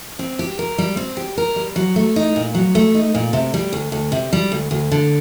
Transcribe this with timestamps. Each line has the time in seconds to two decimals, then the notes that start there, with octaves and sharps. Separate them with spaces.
0.19 C4
0.39 G4
0.59 A#4
0.78 G3
0.97 C4
1.17 G4
1.38 A#4
1.56 G3
1.76 F#3
1.96 A3
2.16 D#4
2.36 A#2
2.55 F#3
2.75 A3
2.95 D#4
3.15 A#2
3.33 C3
3.54 G3
3.73 D2
3.92 D2
4.12 C3
4.33 G3
4.52 D2
4.71 D2
4.92 D3